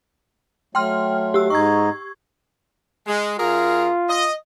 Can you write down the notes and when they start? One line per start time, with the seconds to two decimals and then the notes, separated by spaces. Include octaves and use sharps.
0.75 F#3 A3 G5 C6 F6
1.34 G4 E6
1.50 G#2 D#4 D#5 C#6 G#6
3.07 G#3
3.39 F#2 F4 G#4 A#4
4.09 D#5